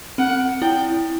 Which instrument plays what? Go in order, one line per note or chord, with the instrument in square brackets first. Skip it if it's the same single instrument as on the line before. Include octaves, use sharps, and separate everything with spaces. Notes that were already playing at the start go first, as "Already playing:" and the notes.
[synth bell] C4 [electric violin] F#5
[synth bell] E4 [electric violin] G5